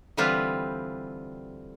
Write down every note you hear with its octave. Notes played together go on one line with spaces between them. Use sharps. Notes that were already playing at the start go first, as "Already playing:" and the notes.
D3 E3 G3 C4 F4 B4